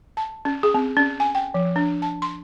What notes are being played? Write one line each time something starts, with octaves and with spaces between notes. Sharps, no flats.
A5
C#4
G#4
C4
C#4
G#5
G5
F3
D4
A5
C6